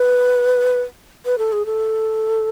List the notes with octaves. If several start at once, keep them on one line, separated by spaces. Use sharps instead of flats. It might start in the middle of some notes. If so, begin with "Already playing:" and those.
Already playing: B4
B4
A4
G#4
A4